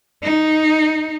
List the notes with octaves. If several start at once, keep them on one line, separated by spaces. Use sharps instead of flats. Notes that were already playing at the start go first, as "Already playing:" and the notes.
D#4